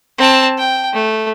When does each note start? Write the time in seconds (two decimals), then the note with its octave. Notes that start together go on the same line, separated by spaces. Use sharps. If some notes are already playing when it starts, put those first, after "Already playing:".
0.19 C4 A5
0.58 G5
0.93 A3